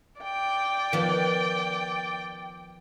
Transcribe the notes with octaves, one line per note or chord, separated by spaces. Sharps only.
D5 G5
D#3 F3 B3